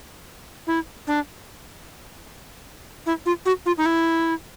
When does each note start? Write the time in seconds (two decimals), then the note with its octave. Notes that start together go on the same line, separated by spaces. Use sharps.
0.67 E4
1.07 D4
3.06 E4
3.26 F4
3.46 F#4
3.66 F4
3.78 D#4
3.86 E4